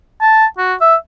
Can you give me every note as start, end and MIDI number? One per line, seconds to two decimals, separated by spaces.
0.22 0.46 81
0.58 0.74 66
0.81 0.95 76